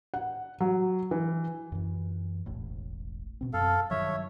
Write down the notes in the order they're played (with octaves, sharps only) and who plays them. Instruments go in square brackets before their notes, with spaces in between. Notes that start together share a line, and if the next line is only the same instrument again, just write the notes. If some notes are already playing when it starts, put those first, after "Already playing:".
[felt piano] F#5
F#3
E3
[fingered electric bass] F#2 E3
E1 A1 A2
B2 C4
[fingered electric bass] F#2 [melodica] A4 F5
[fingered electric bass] G2 D#3 F#3 [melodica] C#5 E5